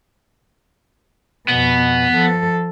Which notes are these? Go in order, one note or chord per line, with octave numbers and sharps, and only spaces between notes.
F2 B2 B3
F3 A4